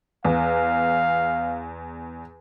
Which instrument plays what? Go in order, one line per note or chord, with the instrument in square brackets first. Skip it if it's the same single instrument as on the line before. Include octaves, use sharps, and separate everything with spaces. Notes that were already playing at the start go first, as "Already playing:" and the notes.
[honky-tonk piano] E2 [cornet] F5